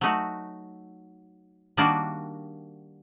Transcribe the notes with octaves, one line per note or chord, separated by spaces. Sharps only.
F#3 A3 D#4 F#4
D#3 G3 A#3 D4 F#4